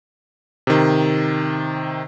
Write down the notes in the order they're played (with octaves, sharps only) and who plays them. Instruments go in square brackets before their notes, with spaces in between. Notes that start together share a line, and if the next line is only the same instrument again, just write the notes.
[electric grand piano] C3 D#3